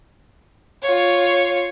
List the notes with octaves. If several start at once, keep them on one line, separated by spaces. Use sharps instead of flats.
F4 C#5